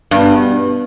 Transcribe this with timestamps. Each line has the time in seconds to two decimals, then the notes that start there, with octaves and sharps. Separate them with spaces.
0.11 G2 B2 G3 B3